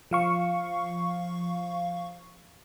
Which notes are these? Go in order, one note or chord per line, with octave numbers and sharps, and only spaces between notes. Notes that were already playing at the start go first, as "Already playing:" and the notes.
F3 F5 C#6